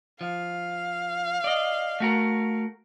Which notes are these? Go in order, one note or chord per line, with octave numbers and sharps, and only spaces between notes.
F3 F5
D5 D#5
A3 F#4 A#4